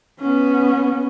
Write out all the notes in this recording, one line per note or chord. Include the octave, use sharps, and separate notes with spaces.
B3 C#4